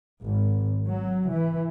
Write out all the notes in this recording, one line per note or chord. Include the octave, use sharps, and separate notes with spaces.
G#1
F#3
E3